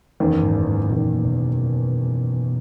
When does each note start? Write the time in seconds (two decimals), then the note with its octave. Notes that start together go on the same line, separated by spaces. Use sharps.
0.20 F#1 E2 D#3
0.43 G#2
0.67 G#2
0.90 F#1 E2 A#2 D#3
1.25 B2